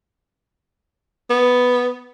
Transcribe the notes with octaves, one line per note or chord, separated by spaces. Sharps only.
B3